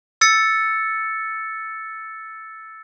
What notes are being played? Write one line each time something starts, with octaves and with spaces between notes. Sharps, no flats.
E6 A6 C#7